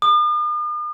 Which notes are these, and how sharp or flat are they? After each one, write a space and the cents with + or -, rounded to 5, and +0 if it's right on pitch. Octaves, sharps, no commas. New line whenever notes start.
D#6 -45